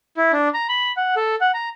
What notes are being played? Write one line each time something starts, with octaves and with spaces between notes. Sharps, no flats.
E4
D4
A#5
B5
F#5
A4
F#5
A#5